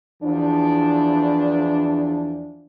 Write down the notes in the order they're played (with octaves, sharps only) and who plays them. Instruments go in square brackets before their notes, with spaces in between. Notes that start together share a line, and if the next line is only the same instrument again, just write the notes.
[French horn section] E2 E3 F3 D4